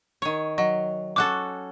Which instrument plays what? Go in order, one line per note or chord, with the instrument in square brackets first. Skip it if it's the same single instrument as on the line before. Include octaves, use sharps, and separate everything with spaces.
[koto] D#3 C#5
[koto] F#3 [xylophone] D#5
[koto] C#4 F#4 A4 [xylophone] D6 F#6